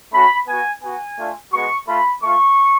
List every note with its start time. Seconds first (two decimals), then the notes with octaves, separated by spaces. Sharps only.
0.12 A3 C#4 F#4 B5
0.47 B3 F#4 G#5
0.82 B3 F#4 G#5
1.17 A3 D4 F4
1.52 G#3 B3 F#4 C#6
1.87 A3 F4 B5
2.23 A3 F4 C#6